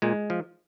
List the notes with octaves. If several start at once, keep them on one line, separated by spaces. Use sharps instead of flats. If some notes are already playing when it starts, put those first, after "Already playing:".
A#2 G#3
F3